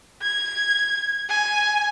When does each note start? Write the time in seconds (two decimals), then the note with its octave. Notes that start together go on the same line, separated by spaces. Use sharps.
0.22 G#6
1.29 G#5